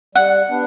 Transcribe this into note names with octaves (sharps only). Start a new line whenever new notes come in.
G3 F#5
B3 D4